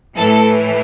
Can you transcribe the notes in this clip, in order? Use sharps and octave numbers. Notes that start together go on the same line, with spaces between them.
A2 E3 A4